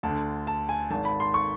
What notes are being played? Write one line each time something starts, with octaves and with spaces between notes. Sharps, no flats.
D2 D3 A5
A5
G#5
G#1 G#2 D#3 A5
B5
C6
C#6